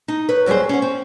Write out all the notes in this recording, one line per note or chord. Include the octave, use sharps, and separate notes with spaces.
D#4
B4 C#5
D#2 F#3 G3 G#4 C5
C#4 F#5
C4